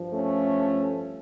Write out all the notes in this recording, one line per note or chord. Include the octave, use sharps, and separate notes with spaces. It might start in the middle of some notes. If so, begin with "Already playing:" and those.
Already playing: G2 F3
A3 C#4